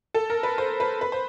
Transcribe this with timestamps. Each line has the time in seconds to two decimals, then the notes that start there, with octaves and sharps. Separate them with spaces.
0.14 A4
0.30 A#4
0.43 B4
0.58 C5
0.80 B4
1.01 B4
1.12 C5